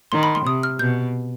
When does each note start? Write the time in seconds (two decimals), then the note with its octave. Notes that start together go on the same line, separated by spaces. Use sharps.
0.12 D#3 C6
0.23 B5
0.35 C6
0.46 C3 D#6
0.63 F6
0.79 B2 G6